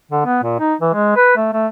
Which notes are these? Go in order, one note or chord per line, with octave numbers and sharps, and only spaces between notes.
D3
B3
A#2
D#4
E3
G#3
B4
A3
A3